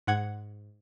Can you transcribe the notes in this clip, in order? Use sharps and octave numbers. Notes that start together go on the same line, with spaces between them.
G#2 F#5 G#6